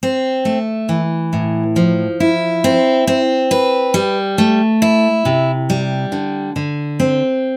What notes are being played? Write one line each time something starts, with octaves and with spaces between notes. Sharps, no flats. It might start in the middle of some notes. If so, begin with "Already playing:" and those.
C4
A3
E3
A2
F3
E4
C4
C4
B4
G3
A3
E4
C3
G3
D3
D3
C4